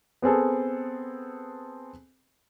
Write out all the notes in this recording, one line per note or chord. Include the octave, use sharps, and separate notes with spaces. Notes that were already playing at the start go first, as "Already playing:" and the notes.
B3 C4 G#4 A4